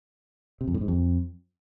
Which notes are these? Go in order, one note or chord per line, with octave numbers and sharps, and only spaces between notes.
C3
F2
A2
G#2
F2